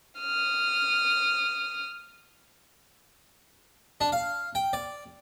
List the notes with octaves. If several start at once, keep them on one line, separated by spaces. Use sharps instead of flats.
D#6 F6
D4
F5
G5
D5